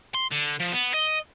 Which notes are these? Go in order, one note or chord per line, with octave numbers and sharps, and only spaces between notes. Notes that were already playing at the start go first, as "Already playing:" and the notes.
C6
D3
F3
B3
D#5